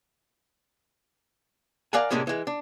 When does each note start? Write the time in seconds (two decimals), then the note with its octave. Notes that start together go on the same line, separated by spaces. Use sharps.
1.93 A#4 D5 F5 F#5 G#5
2.11 A2 C3 G#3 A#3 C#4 D4
2.27 E3 G#3
2.47 D4